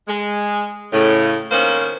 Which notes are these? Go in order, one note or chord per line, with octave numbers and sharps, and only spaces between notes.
G#3
A2 C#3
D#3 A#3 B3 C#4 C5